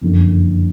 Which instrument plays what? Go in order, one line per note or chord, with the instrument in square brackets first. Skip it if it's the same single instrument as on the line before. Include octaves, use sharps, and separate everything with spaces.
[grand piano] F#1 F2 D3